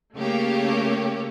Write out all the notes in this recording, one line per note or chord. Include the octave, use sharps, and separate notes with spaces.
C#3 A3 A#3 G4 C#5